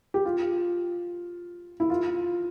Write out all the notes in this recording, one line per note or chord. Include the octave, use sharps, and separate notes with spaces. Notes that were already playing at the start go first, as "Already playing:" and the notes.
G4
F4
E4
F4